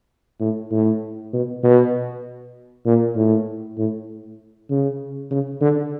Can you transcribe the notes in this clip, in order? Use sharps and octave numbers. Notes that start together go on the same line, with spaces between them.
A2
A2
B2
B2
A#2
A2
A2
C#3
C#3
D3